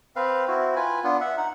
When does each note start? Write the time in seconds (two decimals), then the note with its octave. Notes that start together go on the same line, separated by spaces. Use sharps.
0.16 C4 B4 F5
0.48 C4 E4 F#4
0.76 F4 B4 G#5
1.04 B3 D4 F4
1.21 E5 F#5
1.37 D#4 F#5